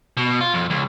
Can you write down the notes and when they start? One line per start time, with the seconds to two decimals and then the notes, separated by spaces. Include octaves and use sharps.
0.17 B2
0.41 F4
0.54 F2
0.70 C#2